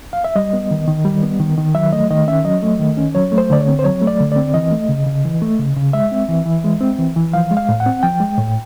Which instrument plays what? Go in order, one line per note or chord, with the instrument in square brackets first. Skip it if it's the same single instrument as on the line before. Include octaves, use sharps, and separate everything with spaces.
[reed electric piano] F5
E5
G3 D#5
B3
D#3
D#3
G3
B3
D#3
D#3
F#3 E5
A3 D#5
D#3 D#5
C#4 E5
F#3 D#5
A3
D#3
C#4
F#3 C#5
A3
C5
D3 D5
C#5
C4
C5
F#3 C#5
A3
D5
D3
C4 D5
E3 D#5
A3
C#3
C#3
E3
A3
C#3
C#3
G#3 E5
C4
E3
E3
G#3
C4
E3
E3
F3 F5
G#3
F5
A2
F#5
C4
F3 G5
G#3
A2